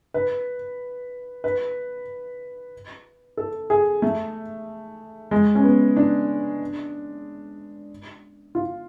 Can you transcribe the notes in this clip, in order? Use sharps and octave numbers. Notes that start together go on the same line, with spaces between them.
B4
B4
A4
G#4
A3
G#3
C#4
B3
D4
F4